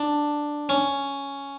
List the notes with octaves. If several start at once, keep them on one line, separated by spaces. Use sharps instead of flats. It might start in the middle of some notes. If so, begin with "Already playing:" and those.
Already playing: D4
C#4